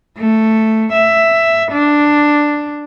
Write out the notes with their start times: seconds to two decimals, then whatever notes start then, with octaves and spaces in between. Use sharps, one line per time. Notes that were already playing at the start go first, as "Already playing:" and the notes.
0.18 A3
0.93 E5
1.72 D4